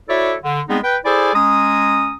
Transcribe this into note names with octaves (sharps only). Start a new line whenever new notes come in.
E4 F#4 A4 C#5 D5 E5
D3
G3 G#3 B3 C4 D#4 G#4
B4 G5
E4 G#4 A4 C5 D5 G#5
G#3 C#4 A#5 D#6